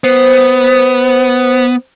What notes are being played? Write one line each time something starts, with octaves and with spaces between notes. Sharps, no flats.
B3 C5